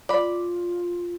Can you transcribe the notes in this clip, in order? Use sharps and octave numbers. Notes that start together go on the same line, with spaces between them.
F4 D5 B5